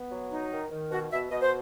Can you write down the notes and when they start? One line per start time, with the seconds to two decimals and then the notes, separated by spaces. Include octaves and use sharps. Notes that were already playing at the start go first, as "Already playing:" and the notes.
Already playing: B3
0.11 F#3
0.31 D#4
0.51 D#3
0.71 D#3
0.91 B2 F#4
1.11 B2 E5
1.30 B2 D#5
1.41 C5